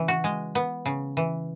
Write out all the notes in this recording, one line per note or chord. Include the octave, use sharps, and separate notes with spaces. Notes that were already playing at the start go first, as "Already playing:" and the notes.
Already playing: C#3 E3
F#4
G#3
B3
C#3
E3